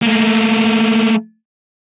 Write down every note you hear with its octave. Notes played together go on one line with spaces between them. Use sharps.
A3 A#3